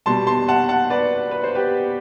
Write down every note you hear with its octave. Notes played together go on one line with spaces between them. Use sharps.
B2 G3 A5 C6
A5 C6
F#5 A5
F#5 A5
B4 D5
B4
C5
G4 B4